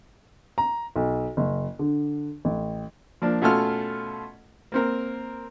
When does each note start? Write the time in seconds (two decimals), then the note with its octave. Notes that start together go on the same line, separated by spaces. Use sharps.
0.58 A#5
0.96 B1
1.37 F#1
1.79 D3
2.45 A1
3.22 F3 A#3 D4
3.42 B2 A3 C#4 F4 A4 F6
4.72 A#3 C4 A#4